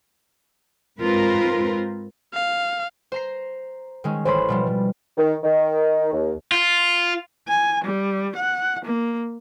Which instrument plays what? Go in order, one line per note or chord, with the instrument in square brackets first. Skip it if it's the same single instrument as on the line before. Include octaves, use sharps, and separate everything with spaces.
[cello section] G#2 C4 F4 A#4 B4
[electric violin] F5
[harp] C5 A#5 C7
D#3 G#3 C#4
[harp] A1 E3 B5 [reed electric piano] C5 C#5 C6
[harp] B2 F3 G3
[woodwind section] D#3
D#3
D#2
[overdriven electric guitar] F4
[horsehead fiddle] G#5
G3
F#5
A#3